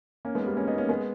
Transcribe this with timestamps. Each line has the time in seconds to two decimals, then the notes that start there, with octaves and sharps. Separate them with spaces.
0.25 A#3 C#4
0.35 G#3 B3
0.46 G3 A#3
0.57 A#3 C#4
0.67 B3 D#4
0.78 A#3 C#4
0.89 G#3 B3